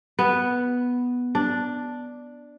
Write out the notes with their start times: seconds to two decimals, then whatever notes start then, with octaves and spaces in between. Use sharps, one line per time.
0.19 B3
1.35 D4